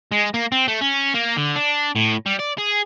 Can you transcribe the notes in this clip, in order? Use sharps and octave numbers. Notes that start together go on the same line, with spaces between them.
G#3
A#3
C4
A3
C#4
A#3
D3
D4
A2
G3
D5
G#4